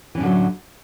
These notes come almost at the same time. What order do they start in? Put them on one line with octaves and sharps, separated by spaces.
E3 C#4 A2 D3 F#3